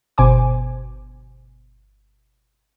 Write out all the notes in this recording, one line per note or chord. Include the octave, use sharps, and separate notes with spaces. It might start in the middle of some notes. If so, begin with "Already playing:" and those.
G1 B2 C5 G#5 D6